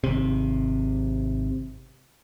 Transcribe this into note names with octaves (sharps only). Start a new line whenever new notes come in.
G#1 C3